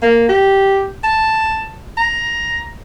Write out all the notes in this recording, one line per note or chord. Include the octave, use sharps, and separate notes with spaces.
A#3
G4
A5
A#5